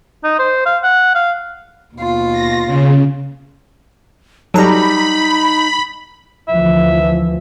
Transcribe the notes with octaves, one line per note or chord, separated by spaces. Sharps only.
D#4
C5
F5
F#5
F5
D#2 B2 F4
A#6
C#3
F#3 G3 D#4 A4 A#5 B5
D2 E3 F3 E5